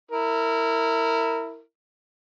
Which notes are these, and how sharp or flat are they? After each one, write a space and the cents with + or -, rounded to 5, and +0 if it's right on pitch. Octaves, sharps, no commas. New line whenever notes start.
E4 -10 A#4 -25